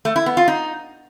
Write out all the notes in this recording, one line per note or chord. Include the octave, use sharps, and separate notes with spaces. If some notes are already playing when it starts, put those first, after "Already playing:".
A3
E4
B3
F4
D#4